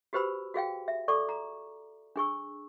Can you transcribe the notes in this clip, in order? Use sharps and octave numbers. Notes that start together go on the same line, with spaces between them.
F#4 G4 B4 C5 B5 E6
F#4 G#4 F5 G5
E5
A4 D5 C#6 D6
A#5
D4 G#4 C#6 E6